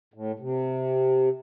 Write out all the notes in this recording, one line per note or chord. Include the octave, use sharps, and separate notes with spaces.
A2
C3